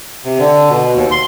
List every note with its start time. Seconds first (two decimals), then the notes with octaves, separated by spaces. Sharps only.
0.25 C3
0.39 D3
0.70 B2
0.95 D#2
1.11 C6